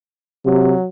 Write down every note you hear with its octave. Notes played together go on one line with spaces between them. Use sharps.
C3 F#3